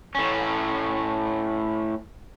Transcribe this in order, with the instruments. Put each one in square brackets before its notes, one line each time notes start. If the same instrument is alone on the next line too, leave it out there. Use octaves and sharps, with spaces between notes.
[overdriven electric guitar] A2 C#4